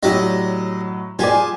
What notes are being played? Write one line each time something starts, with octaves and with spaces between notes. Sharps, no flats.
A2 F#3 G4 D5 D#5
F4 G4 G#4 D5 G#5 A5